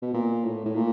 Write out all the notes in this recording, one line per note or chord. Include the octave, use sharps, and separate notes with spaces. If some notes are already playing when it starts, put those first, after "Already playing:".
B2
A#2
A2
A2
A#2